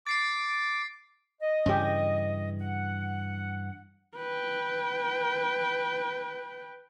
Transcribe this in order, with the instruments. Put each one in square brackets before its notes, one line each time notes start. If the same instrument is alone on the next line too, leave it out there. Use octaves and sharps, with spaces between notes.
[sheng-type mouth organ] D6 [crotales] A6 C7 D7
[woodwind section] D#5
[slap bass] G2 C#3 E3 [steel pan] C#4 G4
[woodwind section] F#5
[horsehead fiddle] B4 G5